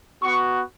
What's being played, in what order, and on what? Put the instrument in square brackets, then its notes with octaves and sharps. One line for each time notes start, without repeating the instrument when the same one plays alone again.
[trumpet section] B3 F#4 C#6